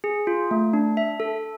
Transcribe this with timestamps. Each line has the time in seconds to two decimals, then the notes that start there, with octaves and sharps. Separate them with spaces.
0.04 G#4
0.27 F4
0.51 A3
0.73 D4
0.97 E5
1.20 A4